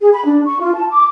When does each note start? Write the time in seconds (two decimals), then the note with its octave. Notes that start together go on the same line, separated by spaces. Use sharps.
0.01 G#4
0.13 B5
0.25 D4
0.46 C#6
0.60 F4
0.74 A5
0.90 D6